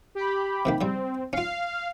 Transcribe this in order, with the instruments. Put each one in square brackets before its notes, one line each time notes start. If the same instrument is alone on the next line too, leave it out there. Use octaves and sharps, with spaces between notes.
[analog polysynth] G4 B5
[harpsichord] C3 D#3 A#3
[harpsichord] C#3 G3 [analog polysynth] C4
[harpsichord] C#4 F4 [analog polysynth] F5